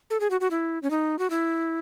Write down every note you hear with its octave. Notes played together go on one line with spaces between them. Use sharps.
A4
G#4
F#4
F#4
E4
C#4
D#4
F#4
E4